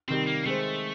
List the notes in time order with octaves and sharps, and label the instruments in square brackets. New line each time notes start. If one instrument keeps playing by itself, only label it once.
[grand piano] C3 D#3 G3 [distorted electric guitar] C4
[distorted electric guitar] A#3
[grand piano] D#3 G#3 C4 [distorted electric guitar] A3